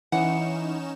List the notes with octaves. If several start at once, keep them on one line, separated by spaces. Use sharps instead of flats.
E3 C#4 D#4 F#5 E7